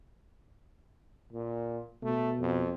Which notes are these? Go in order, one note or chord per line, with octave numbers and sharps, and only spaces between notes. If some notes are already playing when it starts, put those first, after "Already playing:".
A#2
B2 A3
F2